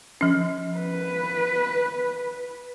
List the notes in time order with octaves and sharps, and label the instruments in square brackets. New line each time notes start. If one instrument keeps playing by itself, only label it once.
[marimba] F3 C#4
[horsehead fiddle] B4